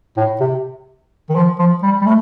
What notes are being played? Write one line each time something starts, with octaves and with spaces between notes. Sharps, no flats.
A2
C3
D#3
F3
F3
G3
G3
A3